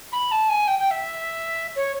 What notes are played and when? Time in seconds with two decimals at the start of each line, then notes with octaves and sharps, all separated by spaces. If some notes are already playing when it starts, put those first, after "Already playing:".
0.12 B5
0.31 A5
0.48 G#5
0.67 G5
0.78 G5
0.90 E5
1.75 C#5